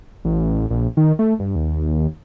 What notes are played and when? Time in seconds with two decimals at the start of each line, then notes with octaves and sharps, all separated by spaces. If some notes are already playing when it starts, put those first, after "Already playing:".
0.25 A1
0.70 A#1
0.97 D#3
1.19 A3
1.39 G2
1.55 D#2